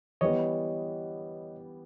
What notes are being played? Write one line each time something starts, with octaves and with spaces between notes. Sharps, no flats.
E3 G3 B3 C#5 D#5